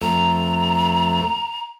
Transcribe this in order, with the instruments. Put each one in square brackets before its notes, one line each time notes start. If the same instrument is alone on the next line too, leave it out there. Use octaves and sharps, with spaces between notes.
[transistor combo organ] F2 A3 [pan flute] A#5